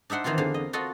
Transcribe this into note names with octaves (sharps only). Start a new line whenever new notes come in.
D4 D#4 E5 F#5 C6
D#3 E3 A#3 C4 F4
E2 D3 F5
D#5
F4 F#4 A4 D#5